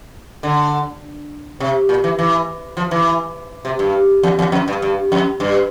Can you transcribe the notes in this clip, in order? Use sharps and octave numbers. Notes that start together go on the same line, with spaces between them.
D3
C3
A#2
E3
E3
F3
E3
C3
G2
E2
E2
F2
G2
G2
F2
G2